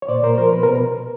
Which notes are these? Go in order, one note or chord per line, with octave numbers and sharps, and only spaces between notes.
C#5
A#2 C5 D5
A#2 A#4 C5
F3 A#4 C5
B2 B4
B2 A#4